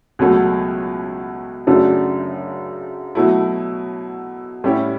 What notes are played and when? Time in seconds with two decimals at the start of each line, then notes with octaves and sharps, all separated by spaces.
0.19 C#2 B2 F#3 A3
1.67 F#2 C#3 F#3 A3 D4
3.15 B2 F#3 A3 E4
4.64 A2 G3 C#4 E4 G4